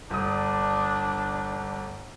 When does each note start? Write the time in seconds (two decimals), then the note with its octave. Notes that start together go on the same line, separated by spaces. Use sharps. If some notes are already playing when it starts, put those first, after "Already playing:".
0.10 G1 D4 D#6